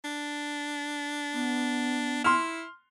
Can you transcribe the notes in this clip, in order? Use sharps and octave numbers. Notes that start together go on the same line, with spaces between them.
D4
B3
E4 C6 F6